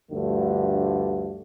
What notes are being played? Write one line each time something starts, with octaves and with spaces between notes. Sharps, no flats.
D2 G2 D3 F3 A3